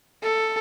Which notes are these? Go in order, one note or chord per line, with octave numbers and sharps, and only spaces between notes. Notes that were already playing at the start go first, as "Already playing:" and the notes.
A4